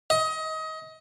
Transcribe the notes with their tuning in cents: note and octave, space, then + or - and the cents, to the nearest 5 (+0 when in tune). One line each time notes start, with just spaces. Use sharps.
D#5 +25